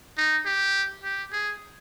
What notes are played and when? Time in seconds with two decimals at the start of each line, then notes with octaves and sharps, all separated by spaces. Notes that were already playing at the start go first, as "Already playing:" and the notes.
0.17 D#4
0.46 G4
1.04 G4
1.32 G#4